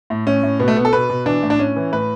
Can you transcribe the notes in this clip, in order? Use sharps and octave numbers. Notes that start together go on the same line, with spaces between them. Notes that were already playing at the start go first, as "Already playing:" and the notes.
A2
A2 C#4
A2
B2 B3
A3
B2 B3
A4
B2 B4
B2
E3 D4
A2
D4
A2 C#4
E3
A2 B4